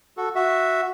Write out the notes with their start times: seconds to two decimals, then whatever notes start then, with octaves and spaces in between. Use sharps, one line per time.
0.17 F#4 A4
0.36 F#4 E5